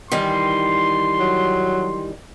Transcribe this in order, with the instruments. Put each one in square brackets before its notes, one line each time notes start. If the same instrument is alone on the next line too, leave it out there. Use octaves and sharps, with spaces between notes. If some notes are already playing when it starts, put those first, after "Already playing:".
[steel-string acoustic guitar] D#3 E3 G3 [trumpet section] C6
[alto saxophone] F#3